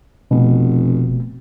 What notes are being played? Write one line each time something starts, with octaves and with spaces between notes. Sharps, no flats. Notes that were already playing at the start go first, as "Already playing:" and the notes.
F1 B2